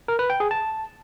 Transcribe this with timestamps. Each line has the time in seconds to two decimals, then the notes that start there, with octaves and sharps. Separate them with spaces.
0.08 A#4
0.19 B4
0.30 G5
0.40 G#4
0.51 A5